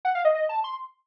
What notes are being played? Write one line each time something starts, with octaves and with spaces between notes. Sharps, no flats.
F#5
F5
D#5
D#5
A5
C6